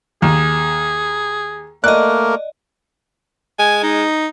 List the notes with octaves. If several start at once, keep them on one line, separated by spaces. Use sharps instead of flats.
D#2 G#4
A3 A#3 A#4 D5 D#5 F#6
G#3 G#5
D#4